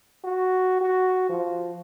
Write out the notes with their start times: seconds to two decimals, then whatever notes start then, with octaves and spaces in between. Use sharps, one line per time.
0.24 F#4
0.81 F#4
1.29 F3